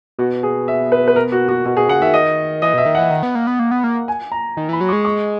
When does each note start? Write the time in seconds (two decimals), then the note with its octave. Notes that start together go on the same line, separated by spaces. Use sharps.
0.19 B2 F#4
0.43 G#4
0.68 E5
0.92 B4
1.08 B4
1.16 A#4
1.32 F#4
1.48 F#4
1.65 B2 F#4
1.77 B2 G#4
1.88 C#3 F#5
2.02 D#3 E5
2.14 D#5
2.62 E3 D#5
2.74 B2 E5
2.86 D#3
2.95 E3 F#5
3.10 D#3
3.23 B3
3.35 A#3
3.47 B3
3.59 A#3
3.71 B3
3.84 A#3
4.08 G#5
4.32 A#5
4.57 D#3
4.69 E3 B5
4.81 F#3
4.89 C#6
4.93 G#3
5.05 C#6